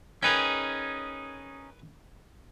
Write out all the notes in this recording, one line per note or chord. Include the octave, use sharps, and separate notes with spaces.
C#4 D#4 G#4 A#4 B4 G5